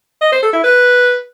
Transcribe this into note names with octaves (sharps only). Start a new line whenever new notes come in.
D#5
C5
A4
E4
B4